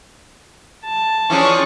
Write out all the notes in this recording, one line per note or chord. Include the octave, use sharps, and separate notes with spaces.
A5
E3 F3 C#4 D4 G#4 C#6